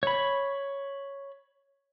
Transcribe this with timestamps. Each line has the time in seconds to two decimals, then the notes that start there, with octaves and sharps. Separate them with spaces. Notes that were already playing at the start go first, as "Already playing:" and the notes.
0.03 C#5 B5